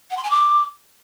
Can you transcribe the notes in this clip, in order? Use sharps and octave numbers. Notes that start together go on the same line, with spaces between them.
F#5
C6
G#5
D6